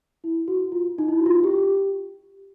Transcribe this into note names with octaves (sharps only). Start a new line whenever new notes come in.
E4
F#4
F4
D#4
E4
F#4
F4
G4